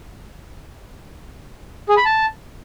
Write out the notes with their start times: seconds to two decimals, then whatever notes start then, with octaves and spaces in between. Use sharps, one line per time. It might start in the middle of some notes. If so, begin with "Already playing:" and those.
1.89 G#4
1.97 B5
2.05 A5